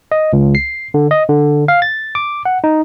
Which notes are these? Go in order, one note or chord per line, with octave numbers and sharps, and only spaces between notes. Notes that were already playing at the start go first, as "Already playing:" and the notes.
D#5
C#2
C7
D3
D#5
D3
F5
A6
D6
F#5
D#4